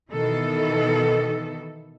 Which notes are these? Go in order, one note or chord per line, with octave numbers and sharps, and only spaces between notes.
B2 D#3 E3 A4